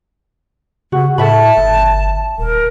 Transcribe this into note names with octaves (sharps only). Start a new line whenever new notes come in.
C#3 F#4
A2 A4 E5 A5 B5
G1
D#1 A#4